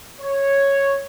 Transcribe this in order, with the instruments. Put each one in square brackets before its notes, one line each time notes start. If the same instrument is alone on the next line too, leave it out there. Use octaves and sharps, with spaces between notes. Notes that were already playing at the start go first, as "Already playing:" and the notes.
[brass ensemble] C#5